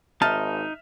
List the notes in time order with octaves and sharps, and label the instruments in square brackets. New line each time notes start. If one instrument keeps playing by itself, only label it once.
[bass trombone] G#1 [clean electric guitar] D#4 [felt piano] E5 F6 [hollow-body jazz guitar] A5